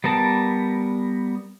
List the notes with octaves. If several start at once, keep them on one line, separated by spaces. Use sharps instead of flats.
G3 B3 A#4 A5